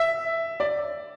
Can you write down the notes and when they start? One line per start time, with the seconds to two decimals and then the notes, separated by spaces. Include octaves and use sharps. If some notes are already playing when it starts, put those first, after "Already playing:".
Already playing: E5
0.60 D5